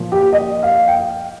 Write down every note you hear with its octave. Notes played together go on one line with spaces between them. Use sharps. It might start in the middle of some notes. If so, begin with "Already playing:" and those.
Already playing: A#2 F3
G4
D#5
F5
G5